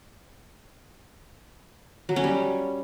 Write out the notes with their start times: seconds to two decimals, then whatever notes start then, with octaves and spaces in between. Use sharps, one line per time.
2.09 F#3
2.16 C#4
2.24 G3